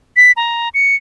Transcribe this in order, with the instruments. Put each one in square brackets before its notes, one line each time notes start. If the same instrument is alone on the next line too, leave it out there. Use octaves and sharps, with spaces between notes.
[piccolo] B6
A#5
C#7